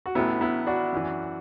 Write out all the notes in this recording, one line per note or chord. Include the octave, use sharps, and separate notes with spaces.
F#4
A1 A2 F#3 B3 E4
B3 E4
D4 F#4
F#2 E3